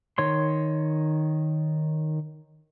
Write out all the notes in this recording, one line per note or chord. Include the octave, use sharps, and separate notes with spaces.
D#3 C#5 C6